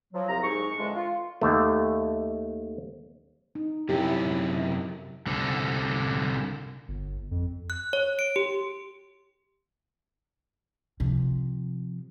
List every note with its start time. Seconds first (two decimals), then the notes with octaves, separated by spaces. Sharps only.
0.14 F3 F#3
0.28 C2 A#5
0.43 G#2 C#6
0.78 F2 D3 E3 G#3 D4
0.95 F4
1.41 D#2 A3
3.55 D#4
3.89 F#2 C3 E4 G4
5.27 C2 D3
6.88 G1
7.31 F2
7.70 F#6
7.93 C#5
8.19 D7
8.36 G4
11.00 C3 F3